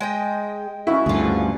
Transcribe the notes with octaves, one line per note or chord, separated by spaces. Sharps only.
G#3 D#5 G5
C#3 E4 F#4
D2 G2 D3 F4 G#4